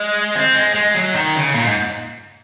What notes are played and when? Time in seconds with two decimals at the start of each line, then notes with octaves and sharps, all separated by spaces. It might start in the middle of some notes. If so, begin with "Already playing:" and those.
Already playing: G#3
0.35 C4
0.55 G#3
0.75 G#3
0.94 F#3
1.15 D#3
1.36 C#3
1.55 A#2
1.66 G#2